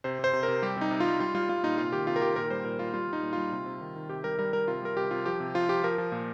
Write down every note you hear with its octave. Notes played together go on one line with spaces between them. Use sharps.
C3 C5
C3 C5
C3
A#4
C3
G3 G4
C3 D#4
C3
F4
G3
G3 F4
G3 F4
G3 F4
A#2 D#4
C3 F4
D#3 G4
C3 F4
A#4
D#3 G4
A#2 A#4
G3 C5
A#2 A#4
G3 F4
G3 F4
G3 D#4
A#2
G3 F4
C3
C3
D#3
D#3
C3 G4
G3 A#4
G3 A#4
G3 A#4
C3 F4
G3 A#4
C3 G4
C3 F4
F3 G4
C3
F3 F4
F3 G4
F3 A#4
F3
A#2